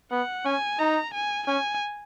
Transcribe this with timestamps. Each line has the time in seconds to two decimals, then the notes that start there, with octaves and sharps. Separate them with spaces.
0.12 B3 F#5
0.45 C#4 G#5
0.79 D#4 A#5
1.14 G#5
1.47 C#4 G#5